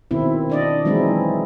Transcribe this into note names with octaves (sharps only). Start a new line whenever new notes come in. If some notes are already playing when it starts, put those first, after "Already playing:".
B2 D#3 C4 E4
D4 D5 D#5
E3 F#3 G#3 C4 D#4 E4